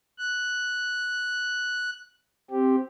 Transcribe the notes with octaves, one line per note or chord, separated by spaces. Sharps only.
F#6
C4 G4